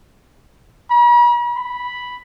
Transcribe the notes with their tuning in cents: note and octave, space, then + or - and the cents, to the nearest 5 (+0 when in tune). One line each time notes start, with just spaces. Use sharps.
B5 -45
B5 -5